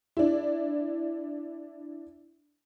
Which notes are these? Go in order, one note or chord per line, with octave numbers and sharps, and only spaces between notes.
D4 E4